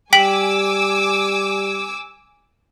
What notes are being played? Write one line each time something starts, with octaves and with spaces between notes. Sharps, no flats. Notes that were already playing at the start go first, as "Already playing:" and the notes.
G3 G5 G#5 D6 E6 B6 F#7